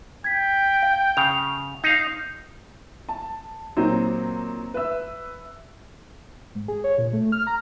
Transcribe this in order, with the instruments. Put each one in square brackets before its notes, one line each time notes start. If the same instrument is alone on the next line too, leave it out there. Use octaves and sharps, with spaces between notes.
[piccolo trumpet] G5 [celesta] G#6 B6
[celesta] F5
[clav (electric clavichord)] C#3 [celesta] F7
[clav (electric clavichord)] D#4 F5 [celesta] G6
[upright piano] A5
A#2 F#3 C4 D#4
B4 E5 E6
[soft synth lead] G#2
G#4
C#5
A#2
A3
F6
A#5